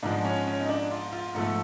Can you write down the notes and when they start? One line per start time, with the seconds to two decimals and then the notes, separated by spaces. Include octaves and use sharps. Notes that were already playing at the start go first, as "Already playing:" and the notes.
0.03 G#2 F3 G#3 D4
0.25 C#4
0.47 C#4
0.60 D#4
0.69 D4
0.91 F4
1.13 F4
1.35 G#2 F3 A3 A4